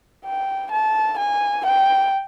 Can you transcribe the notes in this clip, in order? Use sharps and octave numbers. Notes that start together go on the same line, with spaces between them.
G5
A5
G#5
G5